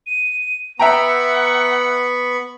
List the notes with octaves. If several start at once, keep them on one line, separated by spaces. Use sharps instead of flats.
D#7
B3 E5 F#5 G5 A#5 B5 C#6